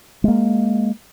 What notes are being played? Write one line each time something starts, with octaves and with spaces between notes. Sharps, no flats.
G#3 A#3